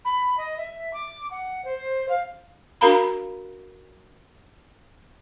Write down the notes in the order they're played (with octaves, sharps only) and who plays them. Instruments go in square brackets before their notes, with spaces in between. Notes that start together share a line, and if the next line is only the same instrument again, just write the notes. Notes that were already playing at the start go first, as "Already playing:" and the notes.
[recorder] B5
D#5
E5
D6
F#5
C5
F5
[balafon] D4 F#4 A#4 F5 A#5 B5